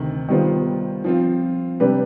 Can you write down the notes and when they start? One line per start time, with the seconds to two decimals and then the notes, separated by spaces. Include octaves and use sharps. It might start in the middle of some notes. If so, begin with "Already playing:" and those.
Already playing: D2 C3 D#3
0.28 D#3 G3 B3 F4 C5
1.04 F3 C4 F4
1.80 C3 G3 D4 G4 B4